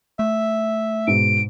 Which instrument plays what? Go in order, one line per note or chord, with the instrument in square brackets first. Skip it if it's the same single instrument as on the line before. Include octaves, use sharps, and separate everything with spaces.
[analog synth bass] A3 [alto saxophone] E5
[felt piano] G#2 B2 [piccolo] D7